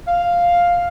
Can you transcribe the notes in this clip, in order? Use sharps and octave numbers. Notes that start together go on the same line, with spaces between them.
F5